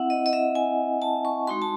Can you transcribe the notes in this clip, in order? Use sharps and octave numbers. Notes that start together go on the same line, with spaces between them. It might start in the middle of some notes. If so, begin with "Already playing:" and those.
Already playing: C4 E4 E5 F#5
D#5
D#5
E5
G#5
A5
C#6
G#3 D#4 F#4 C6
A5